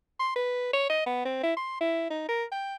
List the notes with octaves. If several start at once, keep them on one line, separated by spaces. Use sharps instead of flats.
C6
B4
C#5
D#5
B3
C4
E4
C6
E4
D#4
A#4
G5